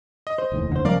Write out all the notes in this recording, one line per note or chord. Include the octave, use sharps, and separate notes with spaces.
D#5
C5
F1 D#2 A2
D3 C5
D#2 C#3 F3 A#4 D5 F5